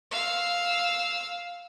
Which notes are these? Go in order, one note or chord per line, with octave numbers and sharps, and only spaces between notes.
F5 E6